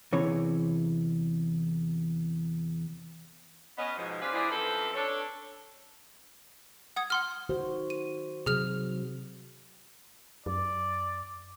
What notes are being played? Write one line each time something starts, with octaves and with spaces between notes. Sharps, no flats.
E2 C3 E3 C#5
B3 C#4 D#5
G#2 B2 F3
C#4 F4 G4 B4 C5 D5
E3 B3 D4 G#4 C5 D5
F#2 F3 C4 A4 B4
D4 A4 C#5
F#5 D#6 G#6
F#5 C6 F6
D#3 F#4 C5
D#7
C3 F#3 G#4 F6 F7
F#2 D5